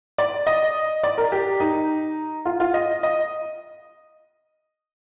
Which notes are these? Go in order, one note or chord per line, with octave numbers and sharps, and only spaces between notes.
D5
D#5
D5
A#4
G4
D#4
F4
F4
D#5
D#5